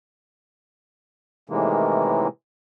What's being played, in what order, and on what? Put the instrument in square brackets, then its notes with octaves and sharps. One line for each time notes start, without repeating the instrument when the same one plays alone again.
[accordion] A2 C3 D#3 E3 G#3 A#3